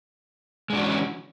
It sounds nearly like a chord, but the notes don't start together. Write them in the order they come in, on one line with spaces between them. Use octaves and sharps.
G#3 D4 F#4 E3 C#4